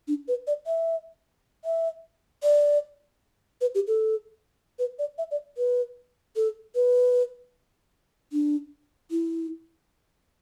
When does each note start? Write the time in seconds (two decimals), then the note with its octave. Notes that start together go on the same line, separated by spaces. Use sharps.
0.07 D4
0.28 B4
0.47 D5
0.66 E5
1.65 E5
2.43 D5
3.61 B4
3.75 G4
3.87 A4
4.79 B4
4.99 D5
5.18 E5
5.31 D5
5.57 B4
6.36 A4
6.75 B4
8.32 D4
9.11 E4